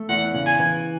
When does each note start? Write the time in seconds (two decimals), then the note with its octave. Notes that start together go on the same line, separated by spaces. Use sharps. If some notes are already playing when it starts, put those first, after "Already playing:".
Already playing: A3
0.09 E2 F#5
0.34 C#3
0.46 G#5
0.59 E3